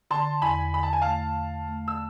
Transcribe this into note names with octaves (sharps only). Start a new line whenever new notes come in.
D3 A5 C6
E2 G#5 B5
D3 B5
A5
G#5
A3 F5 A5
E2
A3
E6